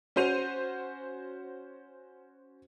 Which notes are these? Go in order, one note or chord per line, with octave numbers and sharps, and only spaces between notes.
C#4 F#4 C5 D#7 F7